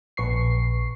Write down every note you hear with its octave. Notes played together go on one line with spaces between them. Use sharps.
A#1 B4 C#6 C7